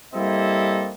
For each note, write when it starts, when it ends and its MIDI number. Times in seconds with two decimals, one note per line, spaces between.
0.14 0.91 55
0.14 0.91 58
0.14 0.91 60
0.14 0.91 64
0.14 0.91 69
0.14 0.91 75